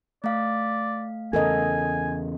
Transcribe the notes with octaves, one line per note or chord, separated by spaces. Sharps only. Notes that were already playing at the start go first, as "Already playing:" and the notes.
A3 D5 F5
E2 C#3 A4 A#4 D#5 G#5